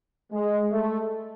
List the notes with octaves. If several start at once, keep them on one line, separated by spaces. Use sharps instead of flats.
G#3
A3